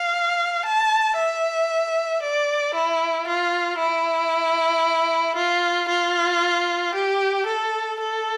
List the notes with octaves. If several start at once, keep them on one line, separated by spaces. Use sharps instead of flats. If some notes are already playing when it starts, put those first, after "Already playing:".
Already playing: F5
A5
E5
D5
E4
F4
E4
F4
F4
G4
A4
A4